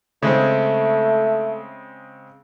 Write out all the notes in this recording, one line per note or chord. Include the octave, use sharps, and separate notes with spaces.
C#3 G#3 A3 C4